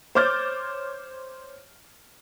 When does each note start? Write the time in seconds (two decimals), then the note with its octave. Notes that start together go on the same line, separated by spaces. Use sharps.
0.15 C5 C#5 D6 F6 G6 A6